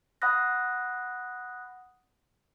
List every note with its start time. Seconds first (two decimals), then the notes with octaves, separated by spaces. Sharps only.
0.22 F#5 B5 D#6 F#6 A#6